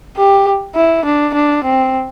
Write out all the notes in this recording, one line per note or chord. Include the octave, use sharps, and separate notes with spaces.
G4
E4
D4
D4
C4